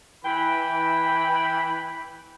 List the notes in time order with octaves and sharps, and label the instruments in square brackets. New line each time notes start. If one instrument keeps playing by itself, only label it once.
[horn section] E3 G5 B5